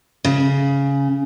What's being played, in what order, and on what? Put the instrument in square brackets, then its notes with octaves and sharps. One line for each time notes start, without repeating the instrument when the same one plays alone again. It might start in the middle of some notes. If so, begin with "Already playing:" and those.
[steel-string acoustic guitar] C#3